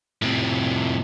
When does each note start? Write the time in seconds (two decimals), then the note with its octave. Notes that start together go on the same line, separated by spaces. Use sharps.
0.22 A2 C3